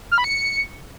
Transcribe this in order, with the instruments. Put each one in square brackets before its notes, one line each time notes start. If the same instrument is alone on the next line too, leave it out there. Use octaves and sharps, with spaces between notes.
[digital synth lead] F6
B5
C#7